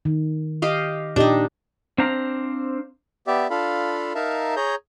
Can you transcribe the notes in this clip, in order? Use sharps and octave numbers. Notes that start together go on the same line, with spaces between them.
D#3
G4 D#5 F5
A#2 D4 D#4 G4 D#5
C4 D4 C5 F5 A#5
B3 G4 D5 E5
D4 F4 A4 F5 B5
D#4 A#4 E5 F5 A5
G#4 C#5 A#5 G6